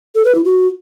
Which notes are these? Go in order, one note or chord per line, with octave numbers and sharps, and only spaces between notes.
A4
B4
E4
F#4